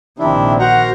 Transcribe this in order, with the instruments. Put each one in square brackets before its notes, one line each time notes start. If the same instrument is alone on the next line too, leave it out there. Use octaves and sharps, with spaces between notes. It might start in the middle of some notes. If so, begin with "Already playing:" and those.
[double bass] A#1 D#3 [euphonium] C3 [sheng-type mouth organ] D4 E4
[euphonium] F#4 [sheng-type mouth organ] A#4 C5 A#5 [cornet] F#5